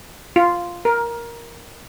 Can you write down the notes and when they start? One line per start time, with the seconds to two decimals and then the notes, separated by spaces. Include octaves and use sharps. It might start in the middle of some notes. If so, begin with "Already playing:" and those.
0.36 F4
0.85 A#4